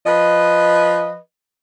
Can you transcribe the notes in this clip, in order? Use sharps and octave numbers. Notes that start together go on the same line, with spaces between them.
F3 B4 D#5